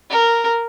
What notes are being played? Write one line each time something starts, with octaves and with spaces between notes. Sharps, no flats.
A#4